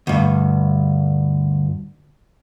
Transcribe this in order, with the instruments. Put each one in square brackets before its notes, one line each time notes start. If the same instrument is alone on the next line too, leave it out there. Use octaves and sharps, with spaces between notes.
[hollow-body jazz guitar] D2 G2